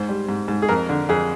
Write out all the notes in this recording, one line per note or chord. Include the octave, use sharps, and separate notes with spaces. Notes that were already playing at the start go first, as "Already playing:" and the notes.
Already playing: G#2 C5
G3
G#2
G#2
G#4
F2 A#4
D3
F2 G#4